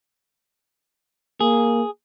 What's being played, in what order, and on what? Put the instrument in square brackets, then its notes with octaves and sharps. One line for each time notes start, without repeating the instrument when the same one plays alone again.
[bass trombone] A#3 [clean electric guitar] G#4